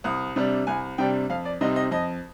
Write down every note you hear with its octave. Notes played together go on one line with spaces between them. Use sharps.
C2 D#6
C3 G3 D4
C2 G#5
C3 G3 D4 G5
F2 F5
D5
C3 G3 C4 D#4 D#5
D#5
F2 D#5